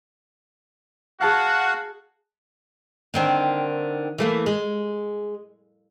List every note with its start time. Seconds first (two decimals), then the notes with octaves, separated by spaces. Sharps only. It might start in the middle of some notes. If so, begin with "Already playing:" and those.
1.21 F#4 G#4 F5 F#5 A5 F#6
3.14 D3 D#3 C4
4.18 E3 A3 A#3
4.46 G#3